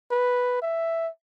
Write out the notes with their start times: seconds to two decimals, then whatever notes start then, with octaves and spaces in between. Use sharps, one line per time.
0.11 B4
0.62 E5